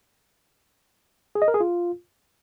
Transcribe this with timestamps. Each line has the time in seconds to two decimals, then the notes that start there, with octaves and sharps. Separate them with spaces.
1.35 G#4
1.42 D#5
1.48 A#4
1.54 G#4
1.60 F4